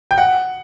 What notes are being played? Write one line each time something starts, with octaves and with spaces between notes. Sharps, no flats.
G5
F#5